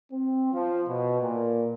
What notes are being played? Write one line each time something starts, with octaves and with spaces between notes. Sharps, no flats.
C4
F3
B2
A#2